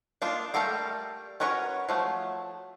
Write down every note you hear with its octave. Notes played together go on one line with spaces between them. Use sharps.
A#3 D4 D#4 F4
G3 A3 A4 A#4 F5
C#4 F#4 A#4 B4 C#5
F3 F#3 A3